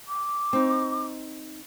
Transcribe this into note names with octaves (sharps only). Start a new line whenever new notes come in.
D6
C4 D#4